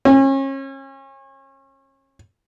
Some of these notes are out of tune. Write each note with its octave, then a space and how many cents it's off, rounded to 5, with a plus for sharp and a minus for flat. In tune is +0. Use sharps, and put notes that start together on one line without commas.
C#4 -35